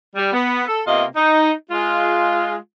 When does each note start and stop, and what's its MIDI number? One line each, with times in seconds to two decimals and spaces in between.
0.16 0.32 55
0.33 0.63 59
0.67 0.82 69
0.87 1.05 48
0.87 1.05 58
0.87 1.05 59
0.87 1.05 65
0.87 1.05 75
1.16 1.51 63
1.71 2.55 56
1.71 2.55 65